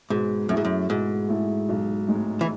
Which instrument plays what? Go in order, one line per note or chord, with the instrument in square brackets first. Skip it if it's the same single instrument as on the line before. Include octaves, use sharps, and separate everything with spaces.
[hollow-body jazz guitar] G#2 [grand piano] B2
[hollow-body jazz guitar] F#2 [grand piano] A3
[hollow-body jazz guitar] G#2 [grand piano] E4 G#4
[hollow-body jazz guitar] F#2
[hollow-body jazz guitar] G#2 [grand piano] B2
[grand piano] A3 E4 G#4
B1
A2 G#3 D#4
[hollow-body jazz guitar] E3